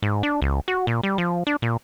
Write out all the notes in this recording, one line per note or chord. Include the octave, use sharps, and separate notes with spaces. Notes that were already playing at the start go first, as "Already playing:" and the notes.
G#2
D4
C#2
F#4
A#2
G3
F3
D4
A#2